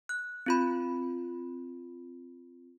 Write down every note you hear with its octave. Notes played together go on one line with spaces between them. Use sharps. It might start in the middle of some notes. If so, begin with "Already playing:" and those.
F#6
C4 F4 B5